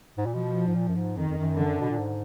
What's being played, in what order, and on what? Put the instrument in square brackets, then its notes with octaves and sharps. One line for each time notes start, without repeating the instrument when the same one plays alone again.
[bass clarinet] G#2
A#2
[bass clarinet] B2 [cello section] F3
[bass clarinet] G#2
A#2
F#2
G#2
[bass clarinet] F2 [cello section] D#3
[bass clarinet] F2
F#2
[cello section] D3
[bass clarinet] B2
A#2
G#2